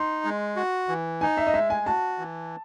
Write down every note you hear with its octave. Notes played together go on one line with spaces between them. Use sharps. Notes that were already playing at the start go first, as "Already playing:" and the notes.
Already playing: D#4 C6
G#3
F#4
E3
D#4 G#5
E5
D#5
G#3 E5
G#5
F#4 A5
E3